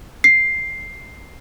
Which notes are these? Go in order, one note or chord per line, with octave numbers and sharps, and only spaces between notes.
C7